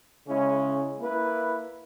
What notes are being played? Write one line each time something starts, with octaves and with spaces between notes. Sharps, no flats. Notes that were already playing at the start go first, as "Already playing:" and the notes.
C#3 G#3 C#4 E4
A#3 E4 B4